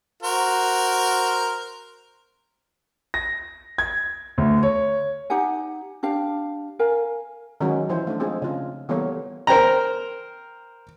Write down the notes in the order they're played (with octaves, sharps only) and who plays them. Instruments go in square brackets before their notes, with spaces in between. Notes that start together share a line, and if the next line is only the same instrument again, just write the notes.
[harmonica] F#4 A#4 C5
[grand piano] A#6
G#6
D2
C#5
[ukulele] D#4 G4 F#5 G#5
D4 G4 F5 G5
A#4 F5 G#5
[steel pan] D#3 F#3 G#3 C#4 F#4
E3 F3 E4 C5
A3 D4
G#3 C4 F4 G#4
C#3 F4
E3 G3 A#3 B3 A4 C#5
[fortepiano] A#4 C5 G5 A#5